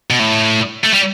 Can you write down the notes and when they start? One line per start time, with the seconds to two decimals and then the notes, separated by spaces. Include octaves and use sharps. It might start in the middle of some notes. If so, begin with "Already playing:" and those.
0.10 B2
0.19 A2
0.84 A3
0.94 G3